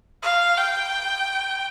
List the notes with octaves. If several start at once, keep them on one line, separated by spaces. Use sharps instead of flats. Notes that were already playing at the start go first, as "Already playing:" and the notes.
F5
G5